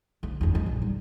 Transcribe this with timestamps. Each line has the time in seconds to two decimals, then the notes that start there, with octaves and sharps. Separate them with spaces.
0.23 D2
0.41 F#1 E2
0.55 G#3
0.66 A#1
0.82 G3